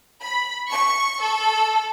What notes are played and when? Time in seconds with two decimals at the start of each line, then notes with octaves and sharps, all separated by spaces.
0.23 B5
0.70 C#6
1.20 A4